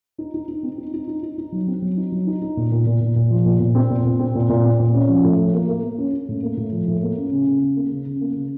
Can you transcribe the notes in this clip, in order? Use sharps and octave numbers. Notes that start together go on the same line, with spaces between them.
D#4
D#4
D#4
C4
D#4
D#4
D#4
D#4
D#4
F#3
C4
F#3
D#4
F#3
D#4
D#4
A#2
A#2
A#2
A#2
A#2
F3
A#2
A#2
C4
A#2
A#2
C4
A#2
A#2
C4
A#2
C#4
F3
A2
F3
A#3
A#3
A#3
C#4
C#4
A2
A#3
A2
F3
A2
A#3
C#4
C#3
C#3
C#3
A#3
C#3
C#3
A#3
C#3